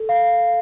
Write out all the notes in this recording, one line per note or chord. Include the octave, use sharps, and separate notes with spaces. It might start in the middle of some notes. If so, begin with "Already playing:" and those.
Already playing: A4
F5